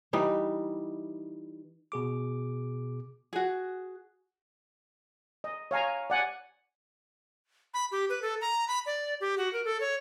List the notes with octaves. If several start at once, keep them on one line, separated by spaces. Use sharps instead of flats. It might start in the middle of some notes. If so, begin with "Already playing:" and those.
E3 G3 D#4
B2 G#4 D6
F#4 G#4
D#5
C#5 F5 G#5 A#5
D5 F#5 G#5
B5
G4
B4
A4
A#5
B5
D5
G4
F#4
A#4
A4
C#5